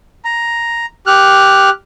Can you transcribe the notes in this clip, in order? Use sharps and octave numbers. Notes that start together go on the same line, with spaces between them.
A#5
G4 F6 F#6